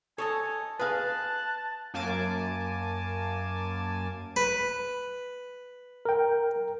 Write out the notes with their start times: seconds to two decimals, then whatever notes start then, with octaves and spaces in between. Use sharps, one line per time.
0.18 A4 C#5 D#5 G#5 A5
0.79 G#4 B4 F5 A5 F#6
1.94 F#2 A#3 G#5 A5 D6
4.36 B4
6.05 A#4 G5